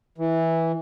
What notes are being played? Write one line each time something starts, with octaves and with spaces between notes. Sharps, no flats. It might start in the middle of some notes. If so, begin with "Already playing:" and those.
E3